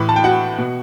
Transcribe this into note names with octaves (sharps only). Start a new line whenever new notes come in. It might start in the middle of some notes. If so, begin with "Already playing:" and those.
Already playing: A2 E3 B4 B5
A5
G5
F#4 F#5
B2